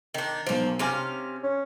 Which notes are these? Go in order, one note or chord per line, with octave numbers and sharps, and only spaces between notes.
D#3 D4
B1 F3 A#3 C5
C3 C#4 F5 G#5 D6 D#7
C#4